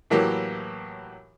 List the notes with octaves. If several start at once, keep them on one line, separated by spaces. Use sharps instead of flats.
A2 E3 F#3 A#3 G4